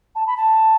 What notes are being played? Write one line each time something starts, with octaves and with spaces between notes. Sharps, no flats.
A5
B5
A5